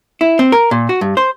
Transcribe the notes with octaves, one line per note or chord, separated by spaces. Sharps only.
E4
C4
A#4
A#2
F#4
G2
C5